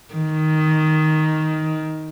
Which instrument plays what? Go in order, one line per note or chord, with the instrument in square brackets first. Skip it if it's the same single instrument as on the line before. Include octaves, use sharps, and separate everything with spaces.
[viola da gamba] D#3